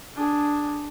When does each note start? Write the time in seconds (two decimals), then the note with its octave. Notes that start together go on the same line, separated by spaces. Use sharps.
0.16 D4 G#4